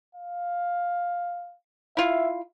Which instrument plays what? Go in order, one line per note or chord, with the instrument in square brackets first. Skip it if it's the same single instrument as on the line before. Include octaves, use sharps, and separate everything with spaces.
[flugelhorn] F5
[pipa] E4 F4 [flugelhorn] E5